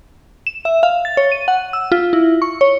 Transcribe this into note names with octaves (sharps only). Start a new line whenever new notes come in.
E7
E5
F5
A6
C#5
D#7
F#5
E6
F4
E4
C#6
C#5